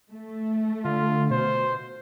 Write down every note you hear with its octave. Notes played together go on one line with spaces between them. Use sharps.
A3
D3 F4
B2 C5